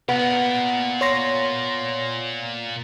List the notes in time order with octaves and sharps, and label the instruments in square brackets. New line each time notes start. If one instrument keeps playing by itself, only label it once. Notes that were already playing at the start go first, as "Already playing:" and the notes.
[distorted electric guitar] A#2 A#4 [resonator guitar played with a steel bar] B3
[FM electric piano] C#5 C6 A#6